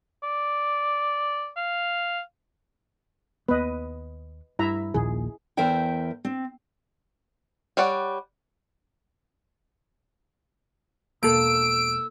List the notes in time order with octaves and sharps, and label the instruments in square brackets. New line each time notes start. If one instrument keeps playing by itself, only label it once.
[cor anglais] D5
F5
[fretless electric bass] D#2 B3 [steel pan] B4 D#5
[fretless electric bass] G2 [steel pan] E4 E5 A#5
[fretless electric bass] A#1 D#2 A#2 [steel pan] G#4
[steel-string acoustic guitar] E2 A#4 C5 E5 G5
C4
[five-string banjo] G3 C#5 D5 F#5
[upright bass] E1 [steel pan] A#3 A4 [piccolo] E6 [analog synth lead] D7